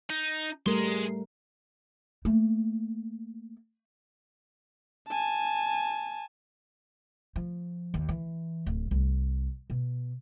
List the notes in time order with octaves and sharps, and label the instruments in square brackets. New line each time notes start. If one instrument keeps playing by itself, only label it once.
[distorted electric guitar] D#4
[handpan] G3 A3 A#4 [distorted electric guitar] G#4 C6
[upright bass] A3 A#3
[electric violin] G#5 A5
[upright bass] F3
D#2
E3
D1
C2
B2